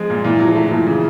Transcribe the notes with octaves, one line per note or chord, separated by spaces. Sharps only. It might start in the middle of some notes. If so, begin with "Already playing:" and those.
Already playing: F3 G#3 C4
A#2
A#2 E3
F#3
F3
A3
E3
A#2
C#3 E3